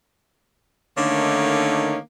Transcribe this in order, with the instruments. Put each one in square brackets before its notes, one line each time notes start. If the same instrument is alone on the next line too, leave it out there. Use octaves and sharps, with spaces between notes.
[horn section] D3 D#3 A3 A#3 C#4 D#4